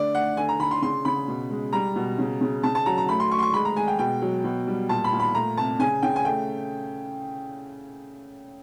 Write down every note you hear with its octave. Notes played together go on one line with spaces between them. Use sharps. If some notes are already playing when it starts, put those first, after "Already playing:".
Already playing: D3 A3 D5
A3 F#5
D3 G#5
A#5
D3 B5
C6
C#3 C6
C#3 B5
B2
G#3
G3 A#5
B2
C#3
C#3
C#3 A5
A5
F#3 A#5
A#5
A3 B5
C6
A3 C#6
C6
C#6
G#3 B5
A#5
G#3 G#5
G5
B2 G5
F#3
B2
G3
A#2 A5
B5
A#2
B5
A3 A#5
C3 A5
C#3 G#5
C#3 G5
G#5
A3 G5